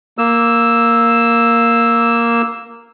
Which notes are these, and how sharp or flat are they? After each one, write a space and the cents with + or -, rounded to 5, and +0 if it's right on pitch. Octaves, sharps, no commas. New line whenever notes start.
A#3 +0 E6 +0